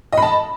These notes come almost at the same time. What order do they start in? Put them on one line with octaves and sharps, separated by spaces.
D#5 B5 A5